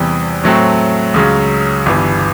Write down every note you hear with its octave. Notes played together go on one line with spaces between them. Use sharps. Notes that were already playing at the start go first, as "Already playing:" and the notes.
Already playing: E2 C3 E3 G3 C4
A2 F#3 A3 C4
C#2 C#3 F#3
G1 G2 E3